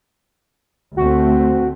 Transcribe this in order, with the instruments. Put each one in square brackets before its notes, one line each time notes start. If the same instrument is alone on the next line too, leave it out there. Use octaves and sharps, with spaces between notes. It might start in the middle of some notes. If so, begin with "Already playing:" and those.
[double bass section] D2 A3 C4 [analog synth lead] F#4